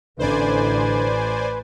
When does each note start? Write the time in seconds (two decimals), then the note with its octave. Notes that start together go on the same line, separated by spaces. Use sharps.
0.19 A1 D3 B4 C5 D5 G#5